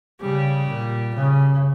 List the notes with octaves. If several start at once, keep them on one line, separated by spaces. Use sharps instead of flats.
C#3 G3
A#2
C#3